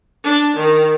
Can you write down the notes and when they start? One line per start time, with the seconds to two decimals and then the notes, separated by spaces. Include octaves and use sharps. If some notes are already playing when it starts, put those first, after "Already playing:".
0.24 D4
0.57 D#3